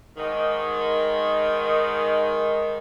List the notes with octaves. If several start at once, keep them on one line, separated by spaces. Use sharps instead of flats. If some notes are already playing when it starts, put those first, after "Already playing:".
G#2 D#3